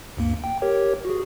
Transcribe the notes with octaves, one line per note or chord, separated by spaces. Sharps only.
D2 G2 A#3
G5
G4 A#4 C#5
F#4 G#4